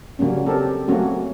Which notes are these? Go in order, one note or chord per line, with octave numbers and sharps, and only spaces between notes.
C#3 F#3 G3 A#3 C#4
C4 G4 A4 A#4
F#3 A3 A#3 C4 C#4 F#4